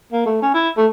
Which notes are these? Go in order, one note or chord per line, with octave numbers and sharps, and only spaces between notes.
A#3
A3
C#4
E4
A3